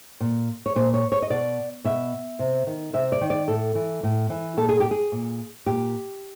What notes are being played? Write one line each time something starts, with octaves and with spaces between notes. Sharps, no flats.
A#2
C#5
A#2 C5
C#5
C#5
D#5
B2 D5
B2 E5
C3
D#3
C3 E5
D5
D#3
D5
A2 A4
E3
A2
E3
A#2 A4
G#4
G4
G#4
A#2
A#2 G4